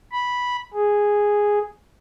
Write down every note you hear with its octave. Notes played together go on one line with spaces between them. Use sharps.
B5
G#4